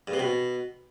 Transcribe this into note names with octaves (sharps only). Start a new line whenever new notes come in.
G2
C3
B2